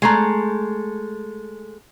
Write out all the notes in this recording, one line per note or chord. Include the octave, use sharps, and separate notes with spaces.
G#3 A3 A#5